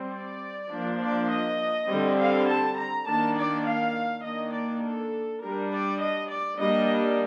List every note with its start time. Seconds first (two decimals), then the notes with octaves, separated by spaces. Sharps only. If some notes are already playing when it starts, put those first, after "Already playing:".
Already playing: G3 C4
0.13 D5
0.71 F3 A#3 D4
1.01 D5
1.30 D#5
1.89 D3 G3 C4
2.18 F5
2.48 A5
2.77 A#5
3.06 D#3 A#3 D4 A5
3.36 D5
3.65 F5
4.24 D#3 A#3 D4 D#5
4.53 D5
4.82 A4
5.41 G3 D4 A#4
5.71 D5
6.01 D#5
6.30 D5
6.59 G3 A#3 D4 D#5